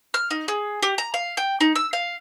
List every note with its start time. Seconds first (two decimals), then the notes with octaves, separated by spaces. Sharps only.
0.14 F6
0.31 D#4
0.48 G#4
0.83 G4
0.98 A#5
1.14 F5
1.37 G5
1.61 D#4
1.76 E6
1.93 F5